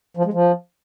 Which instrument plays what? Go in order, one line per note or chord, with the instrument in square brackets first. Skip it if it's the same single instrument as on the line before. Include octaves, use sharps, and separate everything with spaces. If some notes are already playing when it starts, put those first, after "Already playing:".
[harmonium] F3
G#3
F3